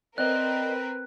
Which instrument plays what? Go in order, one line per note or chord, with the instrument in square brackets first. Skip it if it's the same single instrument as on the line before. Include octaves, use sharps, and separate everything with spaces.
[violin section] C4 A#4 B4 [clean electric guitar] D5 D#5 [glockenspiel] F#6